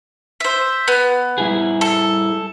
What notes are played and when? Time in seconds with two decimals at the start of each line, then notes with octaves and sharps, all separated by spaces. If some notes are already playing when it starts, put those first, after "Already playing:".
0.40 C5 E5
0.88 B3
1.38 G3 E4 G#4
1.81 A4